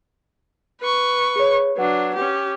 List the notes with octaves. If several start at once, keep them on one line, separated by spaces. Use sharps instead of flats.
B4 C#6
G#4 C#5
F#3 D4 B4 F#5
C#4 G4